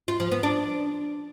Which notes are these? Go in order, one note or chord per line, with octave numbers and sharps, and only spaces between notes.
F4
F3
B3
D4